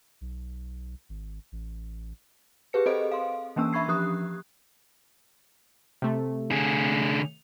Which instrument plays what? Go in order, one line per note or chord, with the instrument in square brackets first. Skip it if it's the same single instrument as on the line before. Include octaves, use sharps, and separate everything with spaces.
[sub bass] B1
G#1
A1
[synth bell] G4 G#4 B4 C#7
C4 G#4 A4 C5 D#5 D7
F5 C6
E3 A#3 C#4 D4 E6
E5 B5 C#6 G#6 C7
F3 G4 D#6 F#6
[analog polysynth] C3 A3
[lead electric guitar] D3 G#4